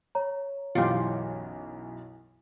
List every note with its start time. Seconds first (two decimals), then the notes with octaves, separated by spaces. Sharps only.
0.15 C#5 A#5
0.75 B1 F#2 E3 F4 G4